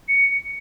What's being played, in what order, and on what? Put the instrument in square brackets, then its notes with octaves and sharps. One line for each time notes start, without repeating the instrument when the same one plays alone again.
[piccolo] C#7